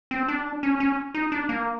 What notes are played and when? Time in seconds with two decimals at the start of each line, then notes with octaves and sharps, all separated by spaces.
0.11 C4
0.28 D4
0.63 C#4
0.80 C#4
1.14 D#4
1.32 D4
1.49 A#3